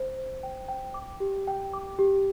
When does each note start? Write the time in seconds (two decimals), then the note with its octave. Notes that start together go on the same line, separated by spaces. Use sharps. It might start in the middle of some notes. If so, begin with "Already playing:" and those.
Already playing: C5
0.17 C5
0.43 G5
0.68 G5
0.94 D6
1.20 G4
1.47 G5
1.73 D6
1.99 G4